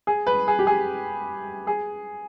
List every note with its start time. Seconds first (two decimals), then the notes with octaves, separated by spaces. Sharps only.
0.07 G#4
0.27 B4
0.48 G#4
0.59 G4
0.67 G#4
1.67 G#4